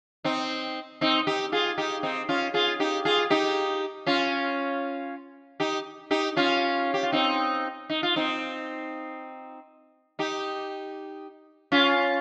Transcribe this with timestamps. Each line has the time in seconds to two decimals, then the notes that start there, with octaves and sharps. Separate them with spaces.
0.24 C4 D#4
1.01 C4 D#4
1.27 D#4 G4
1.52 F4 G#4
1.78 D#4 G4
2.03 C4 D#4
2.29 C#4 F4
2.54 F4 G#4
2.80 D#4 G4
3.05 F4 G#4
3.30 D#4 G4
4.06 C#4 F4
5.60 D#4 G4
6.11 D#4 G4
6.36 C#4 F4
6.94 G4
7.03 F4
7.12 C4 D#4
7.90 D#4
8.03 F4
8.16 C4 D#4
10.19 D#4 G4
11.72 C#4 F4